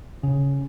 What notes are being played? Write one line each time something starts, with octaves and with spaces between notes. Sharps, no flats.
C#3